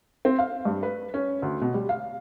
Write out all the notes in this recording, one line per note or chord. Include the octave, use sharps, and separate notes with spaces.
C4
F5
G2
B4
C#4
D2
B2
G3
F5